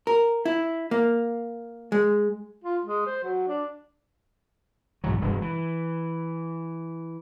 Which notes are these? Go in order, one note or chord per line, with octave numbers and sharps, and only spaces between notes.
A#4
E4
A#3
G#3
F4
G#3
C5
F#3
D4
B1 G#2 E3 F#3
E1 G2 C#3 G#3
E3